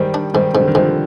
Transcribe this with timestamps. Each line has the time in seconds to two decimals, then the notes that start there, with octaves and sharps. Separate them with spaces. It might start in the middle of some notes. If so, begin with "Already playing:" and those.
Already playing: G#2 D#3 G3
0.14 D4
0.34 G#2 D#3 G3
0.53 G#2 C3
0.60 D3
0.67 D#3
0.75 G#2 D3 F3